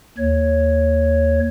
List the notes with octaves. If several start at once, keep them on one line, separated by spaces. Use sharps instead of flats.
D#2 C#5